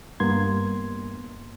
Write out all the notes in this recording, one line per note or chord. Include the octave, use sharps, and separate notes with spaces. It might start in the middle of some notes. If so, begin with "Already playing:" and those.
G2 A#3 B3 C6 G#6